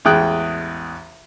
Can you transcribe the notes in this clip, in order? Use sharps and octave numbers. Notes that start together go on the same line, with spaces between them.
A1 E2 G#3 G5 D#6 F#6